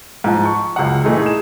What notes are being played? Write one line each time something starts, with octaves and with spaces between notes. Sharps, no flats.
G#2 F3 A5
C#6
C#2 F#2 F#5
A#2 E3 A3 D#4 E4 G#4
G#4 E7